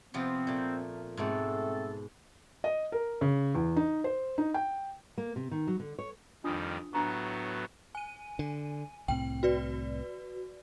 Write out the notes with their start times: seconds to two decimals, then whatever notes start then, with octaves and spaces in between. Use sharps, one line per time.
0.14 C3 F3 B3 C4
0.47 A#2 A3
1.17 G#2 B2 A3 C4 A4 F#5
2.64 D#5
2.92 A#4
3.21 C#3
3.55 E2
3.77 D#4
4.04 C5
4.38 D#4
4.54 G5
5.18 A#3
5.36 C3
5.51 D#3
5.67 F#3
5.80 D3
5.99 C#5
6.44 F2 D#3 G3 D4 F4 D#6
6.93 A2 F#3 B3 D4 A#5 C#6
7.95 G#5 D#7
8.39 D3
9.08 C2 A2 C4 G5
9.43 F#4 B4 D5